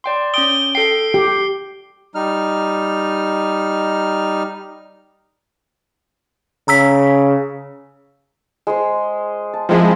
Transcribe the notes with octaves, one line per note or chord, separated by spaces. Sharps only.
D5 G5 C6
C#4 G5 D#6 D7 G7
A4 G5 C7 G7
G4
G3 D#4 F6
C#3 A#5 E6 B6
G#3 C5
A5
F3 G#3 C4 E4 A#4